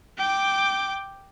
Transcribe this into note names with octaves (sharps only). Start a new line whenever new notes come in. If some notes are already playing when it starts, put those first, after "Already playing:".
G5 D6